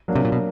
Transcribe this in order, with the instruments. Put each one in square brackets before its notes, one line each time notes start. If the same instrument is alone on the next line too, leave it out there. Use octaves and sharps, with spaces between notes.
[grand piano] F#3 A#3 D4
[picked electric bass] C3
A#2
B2